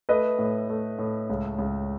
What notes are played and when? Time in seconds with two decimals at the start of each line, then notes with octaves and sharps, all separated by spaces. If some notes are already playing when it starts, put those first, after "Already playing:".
0.09 A3 B4 D#5
0.39 A2
0.69 A3
0.99 A2
1.30 C#2
1.58 C#2